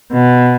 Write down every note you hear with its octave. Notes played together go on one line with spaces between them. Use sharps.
B2